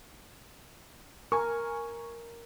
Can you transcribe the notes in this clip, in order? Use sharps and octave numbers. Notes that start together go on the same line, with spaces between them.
A#4 G#5 C#6